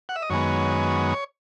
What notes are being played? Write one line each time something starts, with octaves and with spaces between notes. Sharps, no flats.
F#5
E5
D#5
F#2 D#3 G#3 B3 C#5